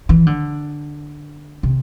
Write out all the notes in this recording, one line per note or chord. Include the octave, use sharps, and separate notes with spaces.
E3
D3
C3